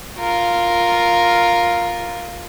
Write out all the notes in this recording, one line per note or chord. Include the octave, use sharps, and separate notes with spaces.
F4 A#4